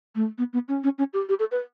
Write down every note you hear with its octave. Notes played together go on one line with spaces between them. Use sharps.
A3
B3
B3
C#4
C#4
C#4
G4
G4
A4
B4